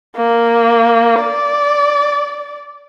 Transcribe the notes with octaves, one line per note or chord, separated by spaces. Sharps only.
A#3
D5